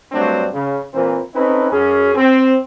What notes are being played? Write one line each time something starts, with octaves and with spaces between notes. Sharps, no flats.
G2 F#3 A3 C4 D4
C#3
A#2 E3 A#3 C4
C4 C#4 D#4 E4 A4 B4
F#2 C#4 G#4
C4